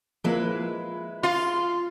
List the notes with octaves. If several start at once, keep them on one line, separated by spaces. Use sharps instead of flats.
F3 G#3 A#3 E4 B4
F4 C6